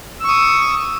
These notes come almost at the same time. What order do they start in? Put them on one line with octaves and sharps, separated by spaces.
E6 C#6 D#6